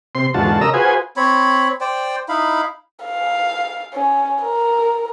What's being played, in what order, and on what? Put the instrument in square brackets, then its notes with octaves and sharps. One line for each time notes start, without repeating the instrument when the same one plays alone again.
[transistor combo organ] C3 C6
E2 G#2 D3 F4 F#4 A5
C#3 A#4 D#5 A#5 E6
F4 F#4 G#4 B4 C5 G#5
[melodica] C4 C#5 B5
C5 D5 G5
D#4 E4 F5 B5
[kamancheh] F5
C#4
A#4